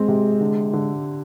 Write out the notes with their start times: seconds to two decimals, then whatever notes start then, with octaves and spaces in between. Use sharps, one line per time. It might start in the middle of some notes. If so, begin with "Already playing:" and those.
Already playing: G#3 C4
0.08 C3
0.41 D3
0.73 D3